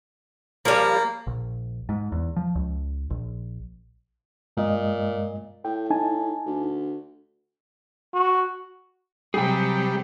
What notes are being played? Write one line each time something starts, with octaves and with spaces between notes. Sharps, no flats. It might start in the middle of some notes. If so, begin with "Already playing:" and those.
F3 G3 A#3
A#1
G#2
E2
F3
C#2
A#1
G2 A#2 G#3 D#5
A2 G5
D#4 G#5 A5
D2
F#4
C3 F#3 G3 G#4 G5